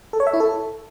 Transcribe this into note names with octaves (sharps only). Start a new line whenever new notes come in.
A4
C#5
E5
E4
A4